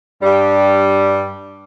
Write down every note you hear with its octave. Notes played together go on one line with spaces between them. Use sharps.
G2 G3